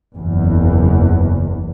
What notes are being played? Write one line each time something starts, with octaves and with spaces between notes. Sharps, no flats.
F#1 E2